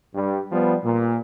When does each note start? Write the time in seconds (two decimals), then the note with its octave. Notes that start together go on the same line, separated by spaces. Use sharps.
0.15 G2 G3
0.52 F3 G3 B3
0.85 A#2